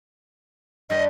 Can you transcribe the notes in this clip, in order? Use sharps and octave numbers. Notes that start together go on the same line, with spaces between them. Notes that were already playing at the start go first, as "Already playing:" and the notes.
G2 G3 B4 D#5